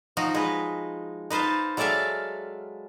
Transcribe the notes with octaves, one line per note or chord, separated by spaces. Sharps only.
F3 D#4 F#4
G#3 B4
D#4 B4 C5 F5 A5
F#3 G#3 A4 D5 E5 F5